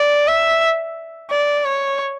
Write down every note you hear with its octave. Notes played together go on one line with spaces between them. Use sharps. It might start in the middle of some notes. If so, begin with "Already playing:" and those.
Already playing: D5
E5
D5
C#5